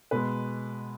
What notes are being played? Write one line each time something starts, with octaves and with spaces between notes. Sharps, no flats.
B2 G#3 B4